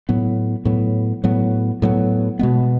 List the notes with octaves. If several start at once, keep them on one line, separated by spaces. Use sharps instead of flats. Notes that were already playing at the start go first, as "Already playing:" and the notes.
A2 F#3 B3
A2 F#3 B3
A2 F#3 B3
A2 F#3 B3
B2 G#3 B3